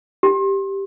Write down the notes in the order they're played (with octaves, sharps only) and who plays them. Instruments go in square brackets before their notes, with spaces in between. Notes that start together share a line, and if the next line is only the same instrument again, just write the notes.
[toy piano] G4